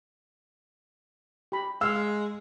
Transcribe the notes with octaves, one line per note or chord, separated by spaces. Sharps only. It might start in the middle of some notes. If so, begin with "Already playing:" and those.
G4 B5
G#3 F5 E6